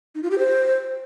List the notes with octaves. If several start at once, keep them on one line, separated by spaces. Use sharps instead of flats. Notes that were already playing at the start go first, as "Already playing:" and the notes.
D#4
F4
G4
C5